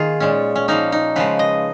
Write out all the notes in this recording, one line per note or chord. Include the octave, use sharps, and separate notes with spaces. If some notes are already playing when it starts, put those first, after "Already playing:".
Already playing: D#3 A#3 F4 G#4
A#2 G#3 C#4
C#4
F3 A#3 C#4 D#4
D#4
C#3 F3 G#3 B4
D#5